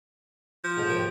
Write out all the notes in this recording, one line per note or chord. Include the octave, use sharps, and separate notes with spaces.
F3
F2 G#2
D#2 G4